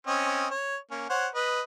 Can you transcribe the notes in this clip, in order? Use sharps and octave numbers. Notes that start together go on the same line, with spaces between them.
C4 C#4 D#5
C#5
A#3 C#4
C5 C#5 F#5
B4 D#5